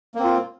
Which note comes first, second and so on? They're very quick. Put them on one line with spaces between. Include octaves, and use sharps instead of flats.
A#3 C4 F4